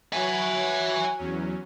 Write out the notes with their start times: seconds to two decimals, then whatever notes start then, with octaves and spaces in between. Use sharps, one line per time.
0.13 F#3 F#4 C#5 E5 G#5
1.18 E2 F#3 C#4